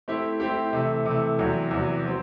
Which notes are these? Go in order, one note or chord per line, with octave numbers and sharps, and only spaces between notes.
A3 C4 E4 G4
A3 C4 E4 G4
C3 E3 A3
C3 E3 A3
E2 C3 F#3
E2 C3 F#3
F#3 C4